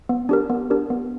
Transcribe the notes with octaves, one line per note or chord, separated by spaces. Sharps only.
B3
D4 G4 A#4
B3
D4 G4 A#4
B3